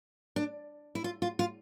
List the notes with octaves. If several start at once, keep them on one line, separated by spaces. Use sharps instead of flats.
D4
E4
F4
F4
F4